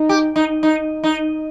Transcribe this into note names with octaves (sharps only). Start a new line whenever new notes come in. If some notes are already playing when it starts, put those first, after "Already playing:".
Already playing: D#4
G4
D#4
D#4
D#4